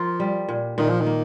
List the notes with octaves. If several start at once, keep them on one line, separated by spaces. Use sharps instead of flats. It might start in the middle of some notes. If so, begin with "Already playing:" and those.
Already playing: F3 F4 A#4
G3
A#2
A#2 D#3
F3
D#3
A#3